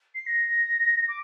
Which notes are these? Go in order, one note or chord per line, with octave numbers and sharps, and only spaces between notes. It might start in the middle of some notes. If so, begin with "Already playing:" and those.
C7
A#6
D6